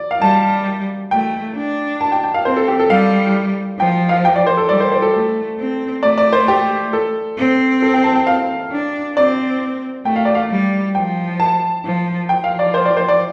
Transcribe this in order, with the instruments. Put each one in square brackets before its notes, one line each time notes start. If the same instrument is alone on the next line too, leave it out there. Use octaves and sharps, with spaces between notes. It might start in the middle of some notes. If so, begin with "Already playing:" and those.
Already playing: [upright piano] D5
F5
[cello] G3 [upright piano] A5
[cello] A3 [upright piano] G5
[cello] D4
[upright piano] A5
G5
G5
F5
[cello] C4 [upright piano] C5
[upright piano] A4
G4
A4
[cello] G3 [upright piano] F5
[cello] F3 [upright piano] G5
[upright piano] F5
G5
D5
C5
A4
[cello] G3 [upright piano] D5
[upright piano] C5
C5
A4
[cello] A3 [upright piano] A4
[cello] C4
[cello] A3 [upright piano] D5
[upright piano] D5
C5
G4
A4
[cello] C4
[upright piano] A4
G5
A5
G5
F5
[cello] D4
[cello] C4 [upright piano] D5
[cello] A3 [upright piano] G5
[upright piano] F5
D5
F5
[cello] G3
[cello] F3 [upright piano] G5
[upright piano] A5
[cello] F3
[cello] F3 [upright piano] G5
[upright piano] F5
D5
C5
D5
C5
D5